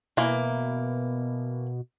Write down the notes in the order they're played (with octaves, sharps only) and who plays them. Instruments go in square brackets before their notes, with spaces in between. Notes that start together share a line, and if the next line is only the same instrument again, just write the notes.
[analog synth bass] B2 [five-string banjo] E3 A#3